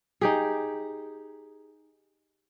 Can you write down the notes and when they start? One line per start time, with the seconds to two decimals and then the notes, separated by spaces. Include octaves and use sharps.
0.21 D#4 G4 G#4